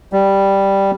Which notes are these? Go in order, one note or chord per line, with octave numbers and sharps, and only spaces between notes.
G3